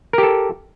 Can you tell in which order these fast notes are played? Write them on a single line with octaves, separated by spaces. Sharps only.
A#4 G4 A4